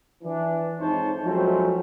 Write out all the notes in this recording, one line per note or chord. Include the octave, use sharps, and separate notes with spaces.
E3 D4
F2 G#2 D#4 C5 C#5 A5
F3 F#3 G#3 A3 C4 C#4